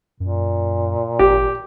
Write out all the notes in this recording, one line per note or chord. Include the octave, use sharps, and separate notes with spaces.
F#2 A#2
G#1 G4